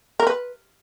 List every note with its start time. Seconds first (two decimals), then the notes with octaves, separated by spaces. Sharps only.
0.20 A#4
0.27 B4